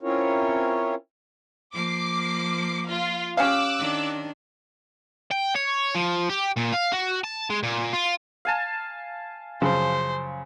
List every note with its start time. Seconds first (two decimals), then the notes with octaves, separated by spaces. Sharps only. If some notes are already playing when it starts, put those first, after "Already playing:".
0.01 C4 C#4 E4 F4 A#4 C#5
1.74 F3 A#3 D6 C7
2.88 F4 F5
3.37 C#4 G4 F5 D6 E6 F#6
3.79 D#3 D4
5.31 G5
5.56 C#5
5.95 F3
6.29 G4
6.56 A#2
6.72 F5
6.92 F#4
7.24 A5
7.50 G#3
7.63 A#2
7.93 F4
8.45 F5 G#5 A5
9.62 F#2 C#3 F3 C5